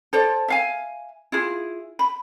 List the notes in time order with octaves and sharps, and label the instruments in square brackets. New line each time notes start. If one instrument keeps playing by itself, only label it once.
[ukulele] A4 C5 D5
E5 F5 G#5
E4 F4 G#4
B5